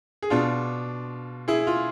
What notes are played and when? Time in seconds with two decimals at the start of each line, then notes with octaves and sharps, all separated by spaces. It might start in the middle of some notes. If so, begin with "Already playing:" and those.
0.22 G#4
0.30 B2 D4 F4
1.48 E4 G#4
1.67 F4